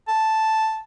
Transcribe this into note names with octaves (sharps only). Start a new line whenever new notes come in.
A5